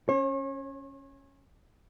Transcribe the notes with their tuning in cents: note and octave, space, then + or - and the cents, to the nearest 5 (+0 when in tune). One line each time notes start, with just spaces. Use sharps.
C#4 -10 C#5 -40